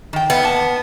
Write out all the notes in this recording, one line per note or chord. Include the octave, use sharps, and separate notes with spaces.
D#3 G5
B3
A#3 A5